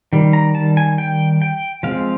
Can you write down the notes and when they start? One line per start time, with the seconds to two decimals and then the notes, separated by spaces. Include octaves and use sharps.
0.13 D#3 G3
0.33 A#5
0.55 A5
0.77 G#5
0.98 G5
1.42 G5
1.83 F3 G#3 C4 F5